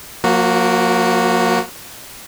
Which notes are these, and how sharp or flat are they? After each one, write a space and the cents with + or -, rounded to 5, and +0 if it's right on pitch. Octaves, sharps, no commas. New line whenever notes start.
F3 +45 A#3 +0 F#4 +0